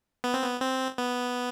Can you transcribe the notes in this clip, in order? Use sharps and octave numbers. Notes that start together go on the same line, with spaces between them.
B3
C4
B3
C4
B3